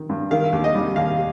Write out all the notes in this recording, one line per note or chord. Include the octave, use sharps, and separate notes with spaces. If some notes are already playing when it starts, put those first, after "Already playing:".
Already playing: D#3
G2
D#3 F5
D#2
D#5
G3
D#2 F5